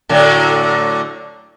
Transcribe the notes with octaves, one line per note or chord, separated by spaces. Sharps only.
A2 D3 F#3